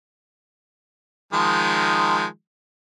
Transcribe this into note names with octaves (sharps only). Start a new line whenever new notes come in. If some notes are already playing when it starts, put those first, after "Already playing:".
D#3 F3 G#3